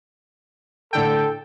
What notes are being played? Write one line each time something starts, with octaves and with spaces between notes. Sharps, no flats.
A2 D3 A4 G5